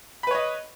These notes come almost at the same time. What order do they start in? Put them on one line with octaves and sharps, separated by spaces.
B5 B4 C#5 D#5